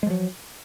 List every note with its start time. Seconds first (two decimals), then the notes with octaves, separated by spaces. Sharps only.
0.03 G#3
0.07 F3
0.10 F#3